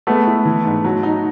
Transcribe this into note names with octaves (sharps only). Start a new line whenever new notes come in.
G#3 A3 B3
E4
E3
G#2
F#3
D#4